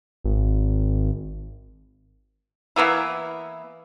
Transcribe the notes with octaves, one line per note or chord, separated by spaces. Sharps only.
G#1
E3 A#3 B3 E4